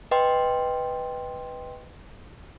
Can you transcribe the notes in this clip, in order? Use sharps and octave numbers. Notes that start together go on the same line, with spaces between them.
B4 D#5 G5 C6